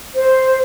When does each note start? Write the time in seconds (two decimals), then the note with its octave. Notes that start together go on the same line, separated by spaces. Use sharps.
0.15 C5